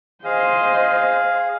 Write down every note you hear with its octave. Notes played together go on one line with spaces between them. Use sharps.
G#4 C5 D#5 F5